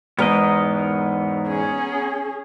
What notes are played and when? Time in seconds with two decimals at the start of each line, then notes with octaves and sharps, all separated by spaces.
0.19 E2 G#2 B3 A#4 D#5
1.48 C#4 G#4